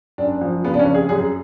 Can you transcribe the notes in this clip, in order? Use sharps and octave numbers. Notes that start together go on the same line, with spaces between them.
F#1 D4
F3
C#3 B3
D4
C#4
F1
G#4
F#2 G#4